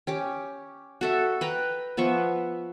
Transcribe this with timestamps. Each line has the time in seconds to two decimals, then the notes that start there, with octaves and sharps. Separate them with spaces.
0.07 C#4 G4 D6
1.01 F#4 A4 E5
1.41 B4 G5 A#5
1.97 F3 B3 E5 C#6